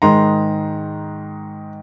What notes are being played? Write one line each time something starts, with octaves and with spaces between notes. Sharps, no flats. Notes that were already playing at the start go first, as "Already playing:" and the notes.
G#2 D#3 G#3 A#5 C6